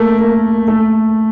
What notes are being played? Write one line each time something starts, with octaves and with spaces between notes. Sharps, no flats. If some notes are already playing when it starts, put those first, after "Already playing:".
Already playing: A3 A#3
A#3
A3